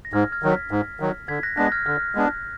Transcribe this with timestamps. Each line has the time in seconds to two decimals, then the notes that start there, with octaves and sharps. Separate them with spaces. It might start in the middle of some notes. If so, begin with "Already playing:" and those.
0.05 A#6
0.13 G#2 F6 G#6
0.32 F6 G#6
0.43 D#3 F#3
0.51 G#6 B6
0.71 G#2
1.00 D#3 F#3
1.28 D3 G#6 B6
1.43 F#6 A#6
1.57 G#3 B3 D4 F#6 A#6
1.67 A#6
1.72 F6 G#6
1.86 D3 F6
2.15 G#3 B3 D4